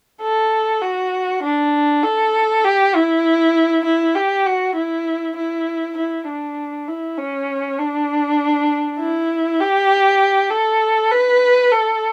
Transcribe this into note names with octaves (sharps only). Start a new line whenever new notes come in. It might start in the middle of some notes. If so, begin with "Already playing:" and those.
A4
F#4
D4
A4
G4
E4
E4
G4
F#4
E4
E4
E4
D4
E4
C#4
D4
E4
G4
A4
B4
A4